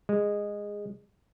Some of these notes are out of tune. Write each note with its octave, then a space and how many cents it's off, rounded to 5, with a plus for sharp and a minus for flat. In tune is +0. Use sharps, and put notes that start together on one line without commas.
G#3 -15